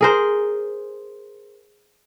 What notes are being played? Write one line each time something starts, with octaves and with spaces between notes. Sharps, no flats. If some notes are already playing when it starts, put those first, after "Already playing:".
G#4 A#4 C5